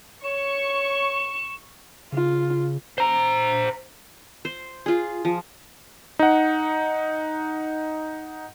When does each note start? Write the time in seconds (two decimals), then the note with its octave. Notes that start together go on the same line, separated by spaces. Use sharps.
0.24 C#5 C#6 E7
2.12 C#3 F4
2.98 C5 A#5
4.45 C5
4.86 F4 G#4
5.25 F3
6.19 D#4 F#5